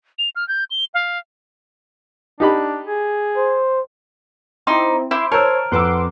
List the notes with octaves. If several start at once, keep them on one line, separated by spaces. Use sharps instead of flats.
F7
F6
G6
G7
F5
D4 D#4 G4 B5
G#4
C5
C4 D#4 E4 C6 D6
E4 C5 C6 D6
A#4 C5 C#5 A5 E6
F2 B4 F#5 C6 D6 E6